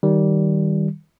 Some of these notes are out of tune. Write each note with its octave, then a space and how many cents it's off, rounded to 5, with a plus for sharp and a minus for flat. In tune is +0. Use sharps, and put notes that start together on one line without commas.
D#3 +0 G3 -15